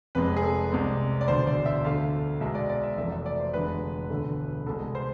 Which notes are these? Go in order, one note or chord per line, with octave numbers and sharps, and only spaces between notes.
F1 F2 C3 G#3 B4
G#4
A4
C2 C3 G#3
D5
E1 D2 D3 C5
D5
E5
D2 D3 A3 F5
B1 B2 G#3 E5
D5
D5
E5
F1 F2 E3 A3 E5
E5
D5
C5
F1 E2 D3 G#3 B4
E1 D2 D3 A3
C2 B2 G#3 A4
C5